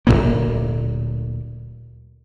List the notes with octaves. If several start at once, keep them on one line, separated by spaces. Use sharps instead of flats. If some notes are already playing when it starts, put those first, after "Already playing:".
D1 G2 A#2 A#3